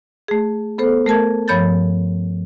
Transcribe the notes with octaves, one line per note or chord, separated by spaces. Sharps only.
A3 G#4
B3 A4 C5
A3 A#4 A5 G#6
G2 F3 C#5 B5 G6 A6